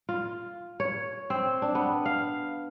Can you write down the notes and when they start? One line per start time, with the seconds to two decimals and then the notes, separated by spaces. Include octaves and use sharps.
0.09 F4
0.80 C#5
1.30 C4
1.62 D4
1.75 B3
2.05 F5